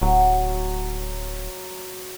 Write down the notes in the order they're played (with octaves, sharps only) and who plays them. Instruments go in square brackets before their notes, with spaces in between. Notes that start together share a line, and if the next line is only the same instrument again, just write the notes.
[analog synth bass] D1 [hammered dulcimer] F#3